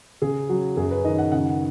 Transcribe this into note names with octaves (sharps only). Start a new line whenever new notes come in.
C#3 G#4
F#3 F#4
F#2 G#4
B4
D#3 D#5
F#5
C#3 F#5